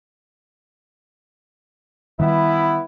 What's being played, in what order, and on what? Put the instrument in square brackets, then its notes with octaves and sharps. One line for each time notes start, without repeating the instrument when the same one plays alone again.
[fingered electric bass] D#3 G3 [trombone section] E3 B3 E4